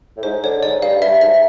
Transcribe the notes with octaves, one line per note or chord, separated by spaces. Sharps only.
A2
G#2 C5
D3 C#5
G#2 D5
G2 F5
G2 E5
G#2 E5